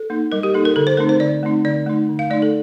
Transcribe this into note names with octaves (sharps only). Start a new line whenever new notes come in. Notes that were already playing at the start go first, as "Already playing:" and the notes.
Already playing: A4
A#3 D#4
G3 A#4
G4
A#3 D#4 A4
A#4
D3 A4
C5
A3 C4 D#4 A#4
C5
D3 D5
A3 C4 D#4
D3 D5
A3 D#4
D3
F5
A3 D#4 D5
A4